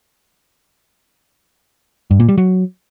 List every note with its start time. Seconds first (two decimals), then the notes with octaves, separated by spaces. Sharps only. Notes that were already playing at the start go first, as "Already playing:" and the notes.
2.11 G2
2.20 A#2
2.29 G3
2.38 F#3